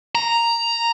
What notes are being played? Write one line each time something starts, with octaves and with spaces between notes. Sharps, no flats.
A#5